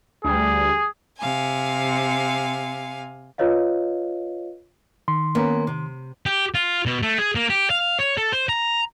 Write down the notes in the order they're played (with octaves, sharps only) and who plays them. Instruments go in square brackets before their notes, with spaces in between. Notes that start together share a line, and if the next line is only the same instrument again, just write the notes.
[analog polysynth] D2 G3 [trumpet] G#4
[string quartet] C3 F5 G#5
[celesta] F4 B4 C#5 D#5 F5
[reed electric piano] D#3 C6
[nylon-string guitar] A#3 B3 C#4
C3
[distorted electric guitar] G4
F4
B2
A3
G#4
A#3
G4
F5
C#5
A4
C5
A#5